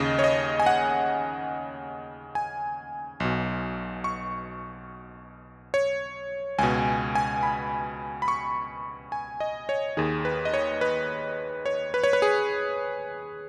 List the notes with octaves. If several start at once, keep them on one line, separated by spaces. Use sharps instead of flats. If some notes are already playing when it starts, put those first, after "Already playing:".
Already playing: D#2 C#3 D#5
C#5
D#5
G#5
F#5
G#5
B1 B2
C#6
C#5
C#2 B2 G#5
G#5
B5
B5
C#6
G#5
D#5
C#5
D#2 D#3 G#4
B4
D#5
C#5
B4
C#5
B4
C#5
B4
G#4